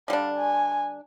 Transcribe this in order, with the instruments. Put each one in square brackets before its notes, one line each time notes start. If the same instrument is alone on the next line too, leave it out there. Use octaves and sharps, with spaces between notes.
[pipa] D3 G3 D4 [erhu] F5
[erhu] G#5